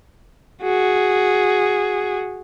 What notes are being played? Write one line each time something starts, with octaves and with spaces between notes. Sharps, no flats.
F#4 G#4